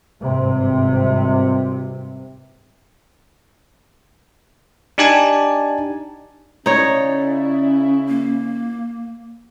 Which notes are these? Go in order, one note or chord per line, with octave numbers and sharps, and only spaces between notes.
G#1 G2 C3
D4 D#4 G4 D5 G#5 A5
C#3 C#4 D#4 E4 C#5 D5
A#3